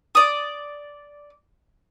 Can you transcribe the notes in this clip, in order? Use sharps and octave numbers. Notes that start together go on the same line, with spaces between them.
D5 D#6